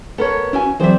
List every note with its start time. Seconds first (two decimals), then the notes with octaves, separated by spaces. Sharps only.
0.18 B3 A4 A#4 C#5
0.53 C#4 E4 F#4 G#5
0.80 E3 F#3 C4 G#4 C5 D5 E5